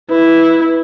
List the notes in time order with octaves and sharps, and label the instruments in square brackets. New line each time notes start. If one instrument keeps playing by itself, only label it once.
[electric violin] E4 [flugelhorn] B4